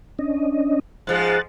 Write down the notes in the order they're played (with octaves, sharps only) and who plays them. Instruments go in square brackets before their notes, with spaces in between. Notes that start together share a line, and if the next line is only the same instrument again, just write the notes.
[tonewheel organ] C#4 D4 D#5
[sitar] G#2 F3 G#3 [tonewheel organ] F#6 A6